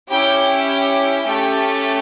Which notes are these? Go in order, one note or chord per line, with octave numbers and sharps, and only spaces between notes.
C#4 E4 G4 G5
G5
A3 C#4 G4 G5